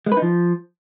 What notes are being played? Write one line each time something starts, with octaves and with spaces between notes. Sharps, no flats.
G#3
B4
D#4
F3